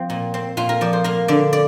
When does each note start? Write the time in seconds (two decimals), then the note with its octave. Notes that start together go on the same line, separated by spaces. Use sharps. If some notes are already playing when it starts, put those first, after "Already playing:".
Already playing: F3 C4
0.10 A#2
0.34 C4
0.57 A#2 F4
0.69 A#4
0.81 F3 D5
0.93 C5
1.04 A#3 A#4
1.28 D3 D5
1.53 D5